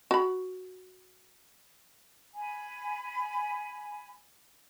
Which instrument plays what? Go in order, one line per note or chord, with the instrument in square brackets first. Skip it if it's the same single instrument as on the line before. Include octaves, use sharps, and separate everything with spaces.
[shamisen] F#4 B5
[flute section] G#5 B5